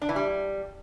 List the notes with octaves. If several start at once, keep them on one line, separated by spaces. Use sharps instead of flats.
D4
E3
G3